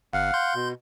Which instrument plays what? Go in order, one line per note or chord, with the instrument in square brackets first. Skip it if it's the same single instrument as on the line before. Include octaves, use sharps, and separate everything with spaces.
[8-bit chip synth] G1 [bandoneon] F5 F#5
[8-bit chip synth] C6 G6
[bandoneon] B2